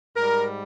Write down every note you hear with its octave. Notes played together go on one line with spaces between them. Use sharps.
G#2 G3 A#4